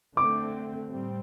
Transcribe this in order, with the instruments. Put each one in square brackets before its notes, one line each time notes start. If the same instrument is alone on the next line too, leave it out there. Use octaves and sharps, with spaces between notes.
[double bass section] D3 A3 C4 [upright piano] D6
[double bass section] A2 G3 C4